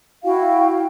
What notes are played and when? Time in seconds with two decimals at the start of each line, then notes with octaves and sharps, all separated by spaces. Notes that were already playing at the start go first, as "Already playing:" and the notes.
0.24 E4 F#4 F5 G5